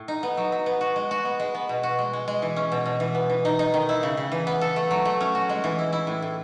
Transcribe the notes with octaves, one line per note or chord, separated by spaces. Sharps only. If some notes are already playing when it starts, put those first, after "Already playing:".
Already playing: A2
D#4
B3
F#3
F#3
B3
F#4
G#3
F#4
B3
G#3
B3
B2
F#4
G#3
G#3
G#3
E3
C#4
B2
B2
E3
B3
E3
D#4
D#4
D#3
E4
C#3
C#3
E3
B3
A4
A3
F#3
A3
C#4
F#4
G#3
E3
E4
E4
A2
A2